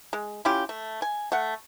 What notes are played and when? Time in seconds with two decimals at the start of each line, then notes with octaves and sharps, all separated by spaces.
0.13 G#3
0.45 C#4 E4 F4 G4
0.69 A3
1.02 G#5
1.32 A3 F#5